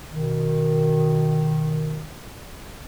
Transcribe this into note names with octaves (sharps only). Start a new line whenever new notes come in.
B2 D#3